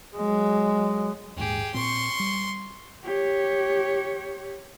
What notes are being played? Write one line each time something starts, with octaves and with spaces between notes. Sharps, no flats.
F#3 G#3
D#1 A#1 G#2 G4 G#4
A#2 C4 C6 C#6
G3
G4 C#5